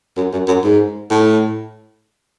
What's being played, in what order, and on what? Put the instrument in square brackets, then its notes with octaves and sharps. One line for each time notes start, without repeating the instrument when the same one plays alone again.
[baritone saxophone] F#2
F#2
F#2
G#2
A2